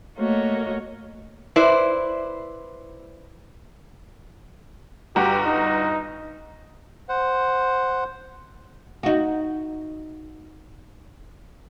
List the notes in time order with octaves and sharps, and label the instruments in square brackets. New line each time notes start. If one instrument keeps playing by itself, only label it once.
[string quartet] A3 A#3 F#4 A#4 C#5 D#5
[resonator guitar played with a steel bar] E4 B4 C5 D5
[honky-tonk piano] G1 F#4 A#5 [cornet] G4
[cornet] D#4
[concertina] C5 F#5
[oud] D#4 F#4